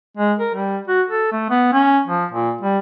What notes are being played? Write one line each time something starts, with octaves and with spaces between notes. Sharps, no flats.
G#3
A#4
G3
F#4
A4
A3
B3
C#4
F3
A#2
G3